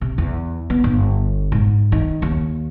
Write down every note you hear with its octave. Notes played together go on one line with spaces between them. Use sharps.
C3
E2
B3
G1
G#2
D#3
D#2